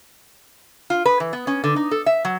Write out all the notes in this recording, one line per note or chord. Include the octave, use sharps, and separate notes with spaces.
F4
B4
E3
B3
C#4
D3
D#4
A4
E5
F#3